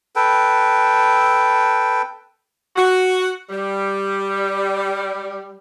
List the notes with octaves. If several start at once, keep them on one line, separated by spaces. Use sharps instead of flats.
A4 B4 G5
F#4
G3